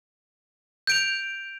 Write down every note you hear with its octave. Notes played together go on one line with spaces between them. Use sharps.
G6 D7 F7